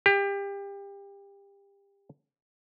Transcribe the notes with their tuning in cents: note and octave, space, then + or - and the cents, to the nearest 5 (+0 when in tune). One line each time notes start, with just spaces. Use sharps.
G4 +30